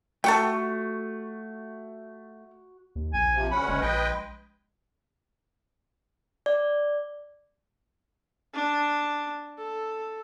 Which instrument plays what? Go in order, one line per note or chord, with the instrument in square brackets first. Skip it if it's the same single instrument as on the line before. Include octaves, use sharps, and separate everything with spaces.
[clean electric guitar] A3 [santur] F#4 [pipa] A4 F#5 G5
[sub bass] D#2
[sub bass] A#1 [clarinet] G#5
[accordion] C3 F3
[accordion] D2 C#4 F#5 [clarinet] B5
[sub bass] F#1 [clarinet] G#3
[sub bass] A#1 [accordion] B4 D#5 G5
[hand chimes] D5
[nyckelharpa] D4
A4